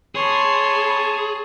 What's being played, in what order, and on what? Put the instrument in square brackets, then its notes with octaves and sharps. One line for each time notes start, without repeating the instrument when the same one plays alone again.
[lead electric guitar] G#4 [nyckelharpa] C#5 A5 [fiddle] B5 C6